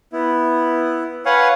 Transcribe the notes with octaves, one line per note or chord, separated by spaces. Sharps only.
B3 E4
B4 C#5 F5 F#5 G#5